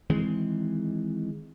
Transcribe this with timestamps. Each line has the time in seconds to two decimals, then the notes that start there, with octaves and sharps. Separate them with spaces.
0.10 D#3 E3 G#3 C4